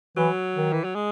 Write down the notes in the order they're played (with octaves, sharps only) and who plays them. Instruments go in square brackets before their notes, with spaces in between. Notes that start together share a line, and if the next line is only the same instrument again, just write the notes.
[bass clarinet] E3 [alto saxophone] F#3
[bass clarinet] D#3
[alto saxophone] E3
F#3
G#3